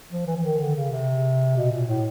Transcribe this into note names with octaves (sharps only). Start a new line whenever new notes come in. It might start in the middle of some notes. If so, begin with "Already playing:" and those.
F3
E3
E3
D#3
D3
C#3
C3
B2
A#2
A2